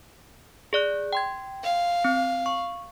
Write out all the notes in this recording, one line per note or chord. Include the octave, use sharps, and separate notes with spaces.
G#4 D5 F#6
G5 C6 G#6
F5
C4
C#6